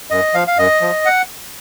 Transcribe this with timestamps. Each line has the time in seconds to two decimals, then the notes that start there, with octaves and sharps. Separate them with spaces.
0.10 F#2 D#5
0.34 F3 F5
0.47 F5
0.57 F#2 D#5
0.81 F3
1.05 F#5